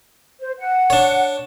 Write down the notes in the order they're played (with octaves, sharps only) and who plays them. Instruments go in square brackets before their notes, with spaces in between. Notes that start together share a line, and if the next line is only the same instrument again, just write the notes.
[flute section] C5
F#5
[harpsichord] D4 C#5